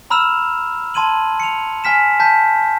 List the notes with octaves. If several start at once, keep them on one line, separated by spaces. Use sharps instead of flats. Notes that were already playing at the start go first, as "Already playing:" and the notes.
A#5 B5 E6 F6 E7 F7
A5 C6 G#6 D#7 F#7
C#7 F7
G#5 F6 B6 E7
A5 G6 B6